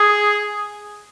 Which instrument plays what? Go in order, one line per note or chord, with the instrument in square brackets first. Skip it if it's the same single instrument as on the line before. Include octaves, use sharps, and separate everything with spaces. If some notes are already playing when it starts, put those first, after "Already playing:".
Already playing: [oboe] G#4